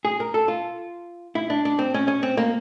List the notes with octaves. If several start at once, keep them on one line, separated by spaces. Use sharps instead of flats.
G#4
A#4
A4
F4
E4
D4
D4
C4
C#4
C#4
C4
A#3